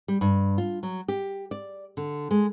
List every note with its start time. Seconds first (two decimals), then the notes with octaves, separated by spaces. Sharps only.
0.08 G3
0.21 G2
0.58 F4
0.83 F#3
1.08 G4
1.51 D5
1.97 D3
2.31 G#3